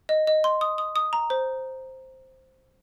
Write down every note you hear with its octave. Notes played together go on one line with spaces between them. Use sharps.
D#5
D#5
C6
D#6
D#6
D#6
A#5
C5